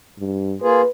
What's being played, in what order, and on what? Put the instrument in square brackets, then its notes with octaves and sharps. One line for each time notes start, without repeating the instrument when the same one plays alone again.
[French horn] G2
[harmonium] A#3 F4 G#4 [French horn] B4